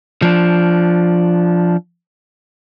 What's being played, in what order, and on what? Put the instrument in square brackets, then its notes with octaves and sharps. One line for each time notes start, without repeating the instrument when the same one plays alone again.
[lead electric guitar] F3 D4